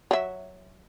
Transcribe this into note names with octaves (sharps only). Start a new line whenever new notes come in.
F#3 E5